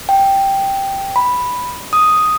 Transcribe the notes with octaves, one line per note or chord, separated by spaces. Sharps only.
G5
B5
D#6